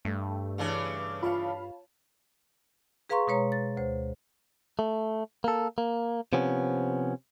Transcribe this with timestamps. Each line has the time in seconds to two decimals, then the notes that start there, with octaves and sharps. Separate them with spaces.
0.05 G2 A3
0.58 C#3 E3 D4
1.23 F4 C#5 F5 A5 B5
3.10 G#4 B4 F5 A#5 C6 C#6
3.27 B2 G#3 B4 C#5 A#5
3.52 A6
3.77 D2 C5
4.79 A3
5.44 A#3 A4
5.78 A#3
6.33 C3 F3 B3 C#4